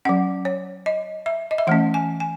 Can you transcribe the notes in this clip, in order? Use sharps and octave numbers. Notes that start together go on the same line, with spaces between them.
F#3 C#4 F#5
C#5
D#5
E5
D#5
E5
E3 A3 C#4 F#5
G#5
G#5